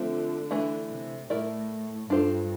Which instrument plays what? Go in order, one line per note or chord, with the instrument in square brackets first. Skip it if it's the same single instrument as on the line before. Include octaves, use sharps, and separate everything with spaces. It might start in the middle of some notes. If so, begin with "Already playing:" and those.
Already playing: [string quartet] D3 [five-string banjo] F3 A3 C4
[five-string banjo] E3 A3 D4
[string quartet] C3
[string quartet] A2 [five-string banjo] A3 E4 A#4 D5
[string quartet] G2 [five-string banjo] D4 F4 A4 C5